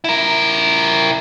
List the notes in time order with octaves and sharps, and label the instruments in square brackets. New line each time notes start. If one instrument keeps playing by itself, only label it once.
[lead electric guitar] E4 A#4